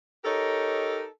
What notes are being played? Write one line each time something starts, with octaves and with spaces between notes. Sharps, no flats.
D#4 G4 A4 A#4 C#5 D#5